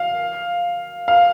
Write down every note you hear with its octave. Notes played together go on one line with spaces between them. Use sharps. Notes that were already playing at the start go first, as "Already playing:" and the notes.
Already playing: F5
F5